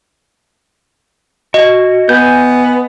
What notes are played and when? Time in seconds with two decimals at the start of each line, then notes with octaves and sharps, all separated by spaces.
1.54 F#4 D#5
2.09 B3 G#5 G6